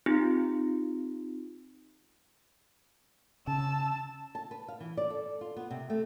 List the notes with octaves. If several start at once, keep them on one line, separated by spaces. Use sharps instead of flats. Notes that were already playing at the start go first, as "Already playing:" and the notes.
C4 D#4 F4 G4
C#3 A5 E6
A5
B4
F5
E3
D5
A4
F4
B3
C3
A3